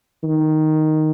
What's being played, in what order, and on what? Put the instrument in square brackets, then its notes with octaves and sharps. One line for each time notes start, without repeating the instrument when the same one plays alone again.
[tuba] D#3